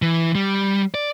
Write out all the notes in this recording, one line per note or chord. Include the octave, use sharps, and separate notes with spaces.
E3
G3
D5